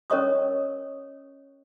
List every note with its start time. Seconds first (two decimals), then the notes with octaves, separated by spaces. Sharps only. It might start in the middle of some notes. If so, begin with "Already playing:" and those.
0.10 C#4 A#4 C#5 D#5 C#6 D#6